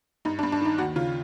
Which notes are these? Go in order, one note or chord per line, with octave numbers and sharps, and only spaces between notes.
G2 D#4
D4
G2
D4
D#3 D#4
D#2 F#4
C#3 F4